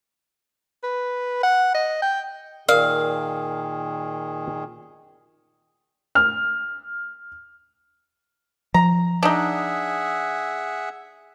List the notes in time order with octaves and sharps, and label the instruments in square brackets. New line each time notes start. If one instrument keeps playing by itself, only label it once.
[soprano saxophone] B4
F#5
D#5
G5
[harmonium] A#2 D#3 G#4 [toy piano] A#4 [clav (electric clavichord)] D5 [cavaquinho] F5
[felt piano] F6
[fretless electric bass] F3 [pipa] A#5
[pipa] D4 D#4 [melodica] G#4 E5 F#5